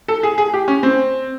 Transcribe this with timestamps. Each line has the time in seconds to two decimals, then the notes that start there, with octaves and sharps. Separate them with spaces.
0.08 A4
0.23 G#4
0.38 G#4
0.53 G4
0.68 C#4
0.83 C4